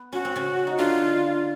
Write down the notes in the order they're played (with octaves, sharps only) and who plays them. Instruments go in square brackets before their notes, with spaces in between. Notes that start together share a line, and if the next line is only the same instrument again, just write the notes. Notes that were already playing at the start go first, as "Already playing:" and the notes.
Already playing: [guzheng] B3
[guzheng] C#4 [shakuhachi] F#4
[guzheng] C4
C#3 C#4
D#4
[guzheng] D3 D4 [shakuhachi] F4